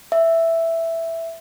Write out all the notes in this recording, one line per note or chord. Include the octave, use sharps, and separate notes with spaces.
E5